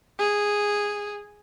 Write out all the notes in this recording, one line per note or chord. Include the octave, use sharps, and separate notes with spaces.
G#4